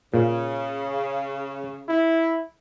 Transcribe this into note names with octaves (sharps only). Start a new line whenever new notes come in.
A#2 C#3
E4